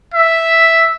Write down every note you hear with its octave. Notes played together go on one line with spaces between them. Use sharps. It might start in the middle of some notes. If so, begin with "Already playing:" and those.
E5